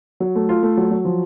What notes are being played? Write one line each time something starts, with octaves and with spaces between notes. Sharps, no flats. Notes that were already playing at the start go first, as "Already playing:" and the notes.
F#3
A3
F4
A3
F#3
F#3
F3